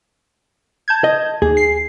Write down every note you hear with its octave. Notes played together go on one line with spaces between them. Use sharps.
A5 G6 G#6
D#5
D#2 G#4
C7